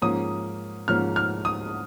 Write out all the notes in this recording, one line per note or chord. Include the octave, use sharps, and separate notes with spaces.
G#2 F3 A#3 C#4 D#6
G#2 F3 A#3 C#4 F6
F6
D#6